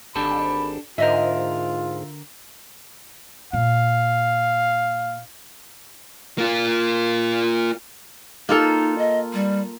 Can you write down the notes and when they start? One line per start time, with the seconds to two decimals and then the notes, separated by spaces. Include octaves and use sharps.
0.16 G#1 D4 G4 A4 B5
0.98 G#2 D3 F4 A#4 C5 D#5 E5
3.53 A#2 F5
6.38 A#3 F4
8.49 A#3 D#4 F4 A4
8.98 D#5
9.33 G3